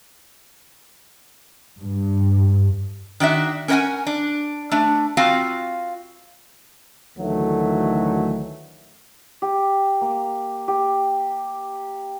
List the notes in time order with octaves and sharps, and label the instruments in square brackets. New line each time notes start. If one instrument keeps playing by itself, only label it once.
[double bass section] G2
[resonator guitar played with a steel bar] D#3 D4 F#4 E5
C#4 A#4 B4 D#5 F#5 G#5
D4
A3 D4
C4 F4 F#4 F5
[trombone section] D2 D#3 E3 F#3 A3
[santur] G4
A#3
G4